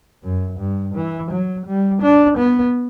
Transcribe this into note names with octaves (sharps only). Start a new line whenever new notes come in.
F#2
G2
E3
F#3
G3
D4
B3